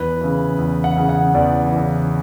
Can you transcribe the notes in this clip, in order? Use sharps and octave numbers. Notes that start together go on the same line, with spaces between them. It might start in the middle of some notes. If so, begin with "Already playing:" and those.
Already playing: E2 B4
C#3 E3
E2
F#5
C#3 E3
F#5
E2 D5
C#3 E3